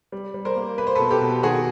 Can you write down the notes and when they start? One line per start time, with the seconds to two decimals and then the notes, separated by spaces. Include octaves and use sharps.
0.12 G3
0.34 G3
0.45 A#4 C5
0.56 A#3
0.78 A#3 B4
0.87 C5
0.95 A4 B4
1.00 B2
1.11 G4 A4
1.21 B2
1.43 D#3 F#4 G#4